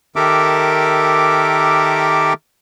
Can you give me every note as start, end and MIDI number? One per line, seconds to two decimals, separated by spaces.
0.16 2.33 51
0.16 2.33 67
0.16 2.33 69
0.16 2.33 70
0.16 2.33 76
0.16 2.33 86